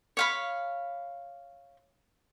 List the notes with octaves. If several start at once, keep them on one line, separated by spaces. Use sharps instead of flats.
C#5 F5 B5